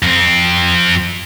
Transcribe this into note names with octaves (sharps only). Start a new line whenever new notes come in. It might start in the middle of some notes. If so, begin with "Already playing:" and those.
F2 C4